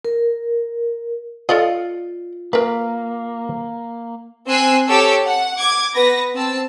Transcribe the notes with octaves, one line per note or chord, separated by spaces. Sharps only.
A#4
F4 A4 D5 D#5
A#3 A#4 B4
C4 G#5 E6 F#6 C7
G4 A4 C#5 A5 D6 E6
F#5
D6 G#6
B3 B4 A#6
C4 A5 E6